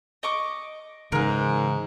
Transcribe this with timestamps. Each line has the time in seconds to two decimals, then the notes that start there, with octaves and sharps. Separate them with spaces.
0.23 D#5 C#6 D6
1.12 G#2 C#3 E3 A#4 B4